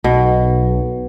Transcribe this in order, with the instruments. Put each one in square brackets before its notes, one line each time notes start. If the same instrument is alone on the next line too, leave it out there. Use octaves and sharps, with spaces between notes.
[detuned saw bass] B1 [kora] B2